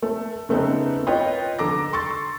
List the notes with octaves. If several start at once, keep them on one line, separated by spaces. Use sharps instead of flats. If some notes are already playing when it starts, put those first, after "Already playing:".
A3
C#3 A3 B3 C4 D#4
F4 B4 C#5 D#5 G5
D3 A4 A#5 D6 A#6
C6 C#6 E6 A6